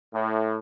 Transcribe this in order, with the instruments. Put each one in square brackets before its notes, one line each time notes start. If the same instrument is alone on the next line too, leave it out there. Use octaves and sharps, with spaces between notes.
[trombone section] A2